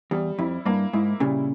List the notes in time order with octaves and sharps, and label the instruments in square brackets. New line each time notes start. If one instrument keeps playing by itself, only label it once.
[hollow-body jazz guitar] E2 [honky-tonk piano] G3
[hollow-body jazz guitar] F2 [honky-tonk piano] E4
[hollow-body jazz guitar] G2 [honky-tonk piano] A#3
[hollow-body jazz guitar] G#2 [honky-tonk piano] E4
[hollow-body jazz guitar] A#2 C#3 [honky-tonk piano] G3